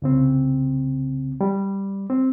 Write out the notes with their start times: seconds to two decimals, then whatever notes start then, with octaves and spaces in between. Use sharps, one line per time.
0.02 C2 C#3 C4
1.41 G3
2.10 C4